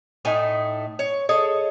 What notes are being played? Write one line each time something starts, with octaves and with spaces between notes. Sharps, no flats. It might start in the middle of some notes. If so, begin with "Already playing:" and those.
A2 A3 D#4 G#5
C#5
G#4 A4 C#5 D#5